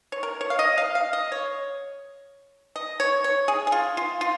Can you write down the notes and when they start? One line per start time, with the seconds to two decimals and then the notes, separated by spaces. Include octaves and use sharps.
0.12 C#5
0.23 A#4
0.41 C#5
0.50 F5
0.59 D#5
0.78 F5
0.95 F5
1.13 D#5
1.32 C#5
2.76 D#5
3.00 C#5
3.24 C#5
3.48 G#4
3.67 G#4
3.72 F4
3.97 F4
4.21 F4